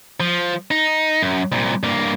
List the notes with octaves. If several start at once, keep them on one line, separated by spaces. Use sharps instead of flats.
F3
D#4
F#2
C2 A#2
G2 A#3